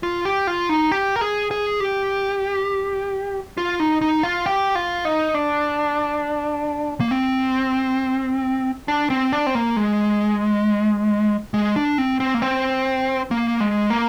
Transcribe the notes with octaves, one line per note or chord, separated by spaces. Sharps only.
F4
G4
F4
D#4
G4
A#4
G#4
G#4
G4
F4
D#4
D#4
F4
G4
F4
D#4
D4
A#3
C4
D4
C4
D4
C4
A#3
G#3
G#3
D4
C4
C4
A#3
C4
A#3
G#3
A#3